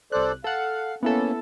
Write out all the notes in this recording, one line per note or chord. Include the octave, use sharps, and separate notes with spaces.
C2 A4 C5 D5 F#6
A4 F5 F#5
A#3 B3 C#4 E4 A4